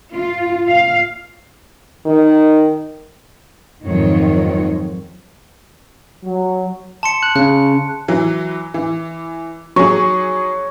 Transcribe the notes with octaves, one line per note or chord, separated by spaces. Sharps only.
F4
F5
D#3
F2 G#2 D#3 F#3 F4 C#5
F#3
A5 C6 C#7
F#6
C#3 F#6
E3 F#3
E3
F#3 G#4 C#5